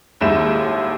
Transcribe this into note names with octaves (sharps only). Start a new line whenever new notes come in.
D#1 D#2 G#2 E4 G6 E7